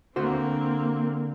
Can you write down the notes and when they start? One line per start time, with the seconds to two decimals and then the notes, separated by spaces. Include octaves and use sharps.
0.16 D3 A#3 C4 F#4 C5